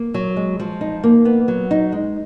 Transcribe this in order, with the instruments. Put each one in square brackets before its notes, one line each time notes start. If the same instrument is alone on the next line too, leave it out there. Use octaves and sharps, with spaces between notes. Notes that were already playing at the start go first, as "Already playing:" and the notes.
Already playing: [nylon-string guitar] A#3
F#3
G#3
F3
D#4
A#3
B3
F#3
D#4
G#3